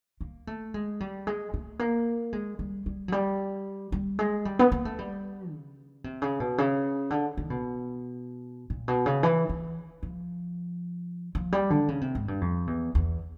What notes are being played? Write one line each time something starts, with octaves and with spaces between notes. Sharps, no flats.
A#3
A3
G#3
G3
G#3
A3
A#3
G#3
G3
G3
F#3
G3
G3
G#3
G3
B3
A#3
A3
G3
C#3
C3
C#3
B2
C#3
D3
D#3
B2
A#2
B2
C#3
E3
E3
F3
F3
G3
D3
C#3
C3
G#2
G2
F2
E2
E2